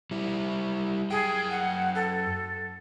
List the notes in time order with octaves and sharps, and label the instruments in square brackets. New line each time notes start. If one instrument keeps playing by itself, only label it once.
[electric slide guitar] G3 E4
[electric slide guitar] F#2 G5 [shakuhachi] G#4
[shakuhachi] F#5
A4